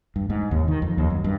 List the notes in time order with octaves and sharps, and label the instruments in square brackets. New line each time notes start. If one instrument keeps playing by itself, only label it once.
[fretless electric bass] G2
G#2
D#2
D#3
F2
D#2
F#2
G2